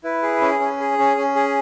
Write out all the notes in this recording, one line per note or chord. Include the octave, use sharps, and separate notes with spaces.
E4 B4
G#4
C#4
C#4
G#4
C#4
C#4
G#4